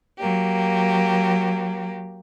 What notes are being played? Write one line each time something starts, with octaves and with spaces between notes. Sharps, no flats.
F#3 A#3 G4